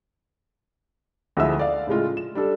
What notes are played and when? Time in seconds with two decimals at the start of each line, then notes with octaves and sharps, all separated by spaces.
1.37 D2 F3 G#3 E4 E5 E6
1.59 D5 F5
1.87 A2 C#3 G#3 F4
2.17 E7
2.35 G3 D4 A4